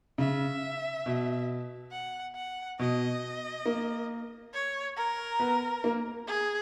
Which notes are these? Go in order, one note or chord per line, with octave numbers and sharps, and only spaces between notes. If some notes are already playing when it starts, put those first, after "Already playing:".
C#3 E5
B2
F#5
F#5
B2 D#5
A#3
C#5
A#4
B3
A#3
G#4